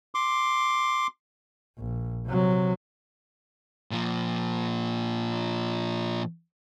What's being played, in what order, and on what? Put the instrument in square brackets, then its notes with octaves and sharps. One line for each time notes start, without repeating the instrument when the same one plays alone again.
[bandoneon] C6 D6
[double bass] A#1
C3 F#3
[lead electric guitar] A#2 F3